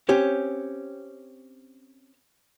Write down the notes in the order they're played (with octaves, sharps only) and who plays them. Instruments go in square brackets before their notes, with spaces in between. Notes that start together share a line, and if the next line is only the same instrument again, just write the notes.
[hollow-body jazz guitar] C4 C#4 G4 C#5